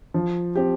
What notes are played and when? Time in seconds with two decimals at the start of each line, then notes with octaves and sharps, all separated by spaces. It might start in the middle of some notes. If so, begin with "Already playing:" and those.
0.14 F3
0.55 C4 G4